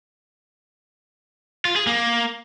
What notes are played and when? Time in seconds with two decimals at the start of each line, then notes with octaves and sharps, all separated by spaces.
1.65 F4
1.76 G#4
1.87 A#3